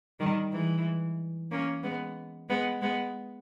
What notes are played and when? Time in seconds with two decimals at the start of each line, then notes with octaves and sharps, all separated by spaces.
0.20 D#3 G3
0.52 E3 G#3
1.51 A#3 C#4
1.83 G#3 B3
2.49 G#3 B3
2.82 G#3 B3